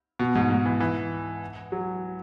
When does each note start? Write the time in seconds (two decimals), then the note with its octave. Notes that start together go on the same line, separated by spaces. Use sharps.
0.19 B2
0.35 G#2
0.50 G#2
0.66 E3
0.80 E3
1.72 F#3